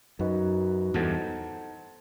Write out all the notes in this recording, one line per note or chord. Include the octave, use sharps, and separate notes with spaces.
F#2 D#4 F#4 B4 D#5
E2 G2 D#4 A4 C5 F#5 A5